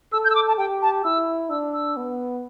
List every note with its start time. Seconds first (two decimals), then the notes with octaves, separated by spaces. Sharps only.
0.12 A4 E6
0.24 G6
0.30 E6
0.35 D6
0.48 A5
0.58 G4 G5
0.82 A5
1.04 E4 E6
1.50 D4 E6
1.74 E6
1.96 B3